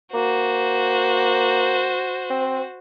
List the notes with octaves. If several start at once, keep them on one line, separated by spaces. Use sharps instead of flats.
A#3 F#4 C5
C4